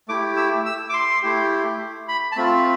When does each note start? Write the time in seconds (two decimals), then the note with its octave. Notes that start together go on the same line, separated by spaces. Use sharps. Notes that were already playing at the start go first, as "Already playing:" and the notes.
0.09 A3 E4 G4 D6
0.36 E6
0.66 E6
0.89 D6
0.94 C6
1.22 A3 E4 G4
2.09 B5
2.32 A5
2.36 A3 C4 F4 B5